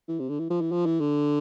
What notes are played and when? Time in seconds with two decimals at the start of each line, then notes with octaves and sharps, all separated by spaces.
0.08 E3
0.20 C3
0.29 D3
0.39 E3
0.50 F3
0.61 E3
0.72 F3
0.86 E3
1.00 D3